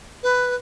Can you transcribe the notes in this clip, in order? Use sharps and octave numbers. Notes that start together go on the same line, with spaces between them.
B4